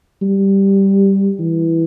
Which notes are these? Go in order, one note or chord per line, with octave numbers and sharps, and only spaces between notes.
G3
E3